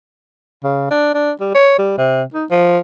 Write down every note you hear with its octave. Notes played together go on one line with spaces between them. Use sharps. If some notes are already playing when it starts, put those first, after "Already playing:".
C#3
D4
D4
G3
C#5
G3
C3
D#4
F3